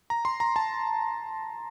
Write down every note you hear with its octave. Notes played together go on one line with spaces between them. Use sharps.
A#5
C6
A#5
A5